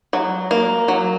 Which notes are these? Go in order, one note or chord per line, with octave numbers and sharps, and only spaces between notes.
F#3
A#3
F#3